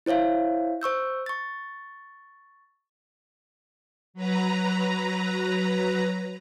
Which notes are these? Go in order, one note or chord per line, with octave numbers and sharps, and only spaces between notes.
E4 C5 C#5 E5 F5
C5 C#6 E6 G6
C#6 A6
F#3 B4 A#5